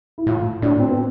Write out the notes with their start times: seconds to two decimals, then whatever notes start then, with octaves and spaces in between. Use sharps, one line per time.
0.18 E4
0.27 A2 F4
0.62 A2 D4
0.80 C4
0.89 B3